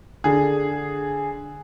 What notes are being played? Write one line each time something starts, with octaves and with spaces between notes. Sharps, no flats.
D3 G#4